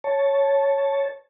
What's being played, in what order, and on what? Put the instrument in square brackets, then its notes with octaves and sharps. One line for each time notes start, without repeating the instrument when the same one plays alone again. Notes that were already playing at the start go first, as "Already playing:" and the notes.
[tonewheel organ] C#5 A5